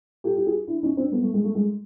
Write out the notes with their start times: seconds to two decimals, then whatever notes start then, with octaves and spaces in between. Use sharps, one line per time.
0.24 G4 A4
0.36 G4
0.46 F#4 G#4
0.68 D4 E4
0.83 C#4 D#4
0.97 C4 D4
1.12 A3 B3
1.23 A3
1.34 G#3
1.44 A3
1.55 G#3